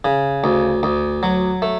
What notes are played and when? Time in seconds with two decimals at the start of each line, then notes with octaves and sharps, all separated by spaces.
0.05 C#3
0.44 D2
0.83 D2
1.23 F#3
1.62 A3